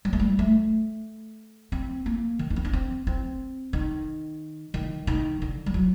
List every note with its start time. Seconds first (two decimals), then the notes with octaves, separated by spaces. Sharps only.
0.05 G3
0.13 A3
0.20 G3
0.39 A3
1.72 C4
2.06 A#3
2.39 D#3
2.50 D4
2.56 C4
2.65 D4
2.73 C4
3.07 C4
3.73 D#3
4.74 D#3
5.07 D#3
5.42 D3
5.66 G3
5.74 F#3